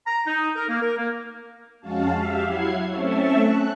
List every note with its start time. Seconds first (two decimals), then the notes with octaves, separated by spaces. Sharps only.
0.07 A#5
0.27 D#4
0.56 A#4
0.69 A#3
0.82 A#4
0.97 A#3
1.81 F2 G#3 C#4 F#4 F5 A5
2.14 G4 E5 F5
2.43 F#3 E4 F#5 G#6 C7
2.88 A3 C4 C#4 E5 A5 C#6
3.39 F#6